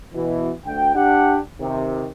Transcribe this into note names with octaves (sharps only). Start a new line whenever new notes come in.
B2 E3
D2 G5
D4 G4 F#5
C3 D#3